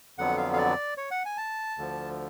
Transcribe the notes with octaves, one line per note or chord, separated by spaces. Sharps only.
F2 D3 F#3 B3 F#5
F5
F5
D5
C#5
F#5
G#5
A5
D2 D3 F3